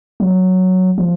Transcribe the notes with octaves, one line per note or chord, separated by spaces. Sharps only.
F#3
F3